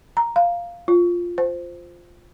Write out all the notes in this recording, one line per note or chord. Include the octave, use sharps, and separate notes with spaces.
A#5
F5
F4
C5